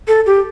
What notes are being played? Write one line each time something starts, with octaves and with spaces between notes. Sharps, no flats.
A4
G4